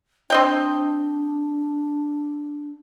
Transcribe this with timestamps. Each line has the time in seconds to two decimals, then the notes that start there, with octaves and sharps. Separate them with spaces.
0.30 C4 D4 D#5 G5